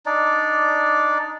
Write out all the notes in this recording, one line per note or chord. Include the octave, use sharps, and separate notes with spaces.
D4 D#4 D5